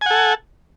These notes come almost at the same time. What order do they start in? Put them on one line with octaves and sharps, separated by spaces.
G#5 F#5 A4